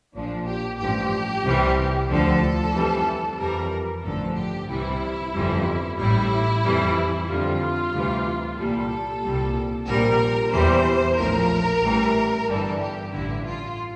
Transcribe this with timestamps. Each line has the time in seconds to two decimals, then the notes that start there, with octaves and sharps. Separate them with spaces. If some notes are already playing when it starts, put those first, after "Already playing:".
0.15 A#1 A#2 F3 D4
0.47 G4
0.79 A1 G2 F3 G4
1.44 C2 C3 E3 G3
2.10 D2 D3 F3 A4
2.74 F2 E3 G3
3.39 F2 E3 G3 A#4
4.04 A1 G2 D3 F3 A4
4.36 G4
4.69 C2 C3 E3 G3 E4
5.34 G1 F2 E3 G3
5.98 A1 A2 G3 E4
6.64 F2 E3 G3
7.28 F2 D3 G3 F4
7.93 D2 C3 E3 G3
8.58 C2 A#2 G3 A4
9.22 C2 A#2 G3
9.87 A#1 A#2 G3 A#4
10.52 E2 E3 G3 C5
11.17 A#1 A2 F3 A#4
11.82 A1 A2 E3 G3
12.47 G1 G2 E3 G3 A4
12.80 G4
13.12 A1 G2 D3 E4
13.45 F4